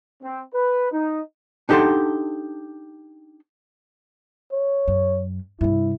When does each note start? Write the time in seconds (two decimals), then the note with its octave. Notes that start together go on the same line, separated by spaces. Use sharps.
0.22 C4
0.53 B4
0.92 D#4
1.69 D4 D#4 G4 A4 F#5 C6
4.52 C#5
4.88 F#2
5.61 G2 C3 E4